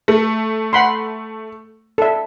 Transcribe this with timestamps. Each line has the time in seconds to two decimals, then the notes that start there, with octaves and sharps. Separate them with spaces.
0.08 A3
0.73 F#5 B5 C6
1.98 A4 E5